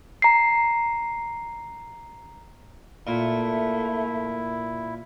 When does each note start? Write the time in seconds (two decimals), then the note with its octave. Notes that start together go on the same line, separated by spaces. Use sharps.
0.22 A#5 C7
3.07 A#2 A3 E4